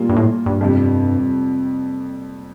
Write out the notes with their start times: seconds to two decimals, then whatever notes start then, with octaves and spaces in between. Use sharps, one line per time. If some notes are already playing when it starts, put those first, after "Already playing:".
Already playing: A#2 G3 A#3 F4
0.09 G2
0.16 A2
0.46 G2
0.61 F2 C3 G3